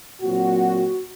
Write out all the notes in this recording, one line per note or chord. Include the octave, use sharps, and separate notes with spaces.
A#2 F#3 C4 F#4